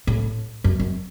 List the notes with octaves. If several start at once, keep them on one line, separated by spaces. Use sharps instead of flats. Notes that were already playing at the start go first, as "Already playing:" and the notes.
A2
F#2
F#2